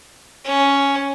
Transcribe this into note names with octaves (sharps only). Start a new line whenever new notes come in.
C#4